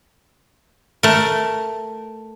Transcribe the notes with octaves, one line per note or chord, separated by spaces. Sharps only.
A3 A#4